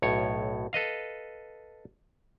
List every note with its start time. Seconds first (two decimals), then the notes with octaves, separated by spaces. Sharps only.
0.02 B1 A2 C#5
0.73 A4 B4 D#5 F5